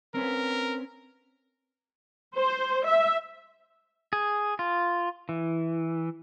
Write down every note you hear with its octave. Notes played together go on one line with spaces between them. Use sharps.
C4 C#4 A#4 B4
C5
E5
G#4
F4
E3